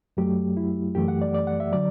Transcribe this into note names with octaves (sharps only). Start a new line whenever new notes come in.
F#2 F#3 A3 G4
E4
F#2 E3 A3 G4
F#5
D5
D5
F#5
E5
D3 F#3 D5